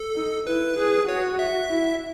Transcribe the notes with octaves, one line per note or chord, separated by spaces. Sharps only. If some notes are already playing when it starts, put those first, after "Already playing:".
Already playing: A4
D#4
E4 B4
G#4
F#4 C#5
E5
E4